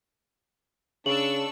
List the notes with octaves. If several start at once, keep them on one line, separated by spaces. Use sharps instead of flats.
C#3 D4 C#6 E6 F#7